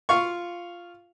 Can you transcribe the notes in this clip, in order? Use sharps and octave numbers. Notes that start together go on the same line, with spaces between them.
F4 F5 C#6